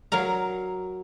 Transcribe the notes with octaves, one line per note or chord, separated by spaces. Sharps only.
F#3 A#4 F5 A#5